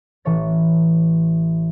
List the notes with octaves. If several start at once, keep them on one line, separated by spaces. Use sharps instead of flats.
A1 E3 A4 C#5 A6